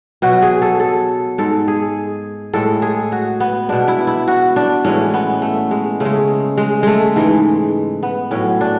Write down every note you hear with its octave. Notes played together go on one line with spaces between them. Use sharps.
B2 F#3 F#4
G#4
A4
A4
G#2 G#3 A4
G#4
A2 G#3 A4
G#4
F#4
B3
B2 G#3 D4
E4
E4
F#4
D4
A2 E3 G#3 C#4
B3
A3
G#3
C#3 G#3 A3
G#3
G#3 A3
G#2 E3 G#3
B3
A2 F#3 C#4
D4